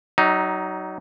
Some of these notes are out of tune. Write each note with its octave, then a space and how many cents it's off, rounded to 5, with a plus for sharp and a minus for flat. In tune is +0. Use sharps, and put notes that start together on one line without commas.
F#3 +30 D#4 +0 E5 -25